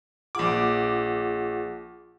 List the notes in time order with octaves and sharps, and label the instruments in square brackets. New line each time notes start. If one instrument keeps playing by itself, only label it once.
[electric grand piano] A#1 D6 [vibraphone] F4 G#4 F#5